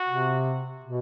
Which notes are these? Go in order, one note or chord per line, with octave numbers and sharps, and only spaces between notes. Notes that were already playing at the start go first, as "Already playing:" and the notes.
Already playing: F#4
C3
B2